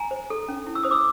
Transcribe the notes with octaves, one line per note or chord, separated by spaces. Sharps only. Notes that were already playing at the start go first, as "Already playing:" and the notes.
Already playing: G#5 A#5
C5
A4
C#4
E4
E6
C5 D#6
D6 E6